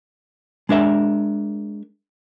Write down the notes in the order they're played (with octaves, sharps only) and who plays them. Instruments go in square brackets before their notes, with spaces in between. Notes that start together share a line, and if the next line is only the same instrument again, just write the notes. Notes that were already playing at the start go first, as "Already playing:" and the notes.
[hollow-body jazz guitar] G#3 D4 A#4 E5